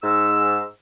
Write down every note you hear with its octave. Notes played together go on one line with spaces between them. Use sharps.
G#2 E6